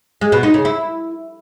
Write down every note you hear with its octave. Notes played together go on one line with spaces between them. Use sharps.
G#3
B2
D#4
C#3
E4